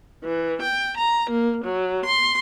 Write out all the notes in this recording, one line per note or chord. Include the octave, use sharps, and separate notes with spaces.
E3
G5
A#5
A#3
F#3
C6